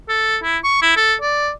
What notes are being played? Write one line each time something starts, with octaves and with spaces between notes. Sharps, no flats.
A4
E4
C#6
E4
A4
D5